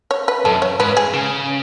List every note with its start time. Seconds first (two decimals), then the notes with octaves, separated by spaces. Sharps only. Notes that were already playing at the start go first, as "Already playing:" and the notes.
0.11 C#5
0.28 B4
0.45 F#2 A4
0.62 C#5
0.80 G#2 B4
0.97 G#4
1.14 C#3